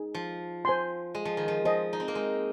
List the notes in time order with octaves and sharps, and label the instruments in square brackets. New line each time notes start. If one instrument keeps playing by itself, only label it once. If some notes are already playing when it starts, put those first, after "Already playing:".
Already playing: [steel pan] D#4 G#4
[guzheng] F3
[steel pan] C5 G#5 C6
[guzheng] G#3
F3
D#3
F3
[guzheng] F3 [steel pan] G#4 C5 D#5
[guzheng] D#4
C4
A#3
G#3